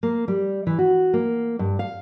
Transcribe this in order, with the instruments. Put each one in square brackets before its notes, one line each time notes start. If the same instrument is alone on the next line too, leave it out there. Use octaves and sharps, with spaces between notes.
[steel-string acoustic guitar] A#3
G3
E3
F#4
A#3
G2
F5